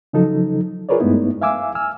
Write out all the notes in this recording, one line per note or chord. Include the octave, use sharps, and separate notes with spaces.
C#3 F3 F#3 D#4 A4
F4 G#4 A#4 B4 C#5 D5
G2 G#3 A3 B3 D#4 E4
E5 F5 G#5 D6 E6
G#5 E6 F6